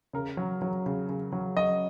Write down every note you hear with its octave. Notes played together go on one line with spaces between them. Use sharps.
C#3 A#4
F#3
F#3
C#3
C#3
F#3
F#3 D#5